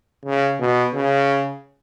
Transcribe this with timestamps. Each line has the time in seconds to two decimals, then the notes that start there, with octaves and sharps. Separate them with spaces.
0.26 C#3
0.60 B2
0.94 C#3